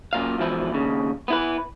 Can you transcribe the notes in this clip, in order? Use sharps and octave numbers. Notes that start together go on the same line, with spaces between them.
F#2 A#2 F5
G#2 B2 E3 F3 E4
D#2 C#3
B3 E4 B4